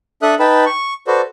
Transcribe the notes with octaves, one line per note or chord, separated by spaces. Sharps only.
D4 A4 E5 D#6 F#6
D#4 B4 G5 A5 B5
C#6
F#4 A4 B4 C5 D5